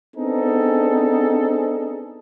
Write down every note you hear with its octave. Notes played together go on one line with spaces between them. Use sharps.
B3 C4 D4 D#4 G#4 A4